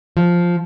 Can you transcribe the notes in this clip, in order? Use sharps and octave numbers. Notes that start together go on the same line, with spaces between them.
F3